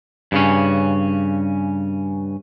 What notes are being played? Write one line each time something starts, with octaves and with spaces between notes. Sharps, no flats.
G2 C#3 C#4